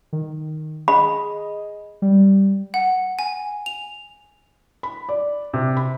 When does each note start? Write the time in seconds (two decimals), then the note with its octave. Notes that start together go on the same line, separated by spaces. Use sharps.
0.13 D#3
0.88 G#4 D#5 B5
2.02 G3
2.74 F#5
3.19 G#5
3.66 F7
4.83 B5
5.09 D5
5.54 C3
5.77 B5